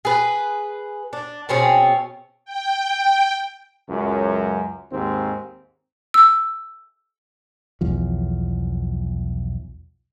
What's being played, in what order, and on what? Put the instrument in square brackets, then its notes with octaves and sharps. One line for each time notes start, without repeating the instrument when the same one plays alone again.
[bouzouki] G#4 B4
D4
B2 C4 C#4 G#4
[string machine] G5
[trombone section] C#2 F#2
D#2 G#2 C4
[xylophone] E6
[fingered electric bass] B1 E2 F3